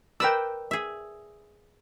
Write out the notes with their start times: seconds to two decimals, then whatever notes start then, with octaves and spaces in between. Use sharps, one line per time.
0.20 A#4 B4 D5 G5 E6
0.71 G#4 E5